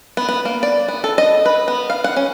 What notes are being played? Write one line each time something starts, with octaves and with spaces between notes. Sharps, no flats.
B3
B3
A#3
D5
B3
A4
D#5
B4
B3
F5
F#5
C#4